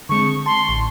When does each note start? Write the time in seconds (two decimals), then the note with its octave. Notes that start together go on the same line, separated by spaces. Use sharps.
0.09 D3 G#3 C4 C#6
0.46 A5 C6
0.69 A1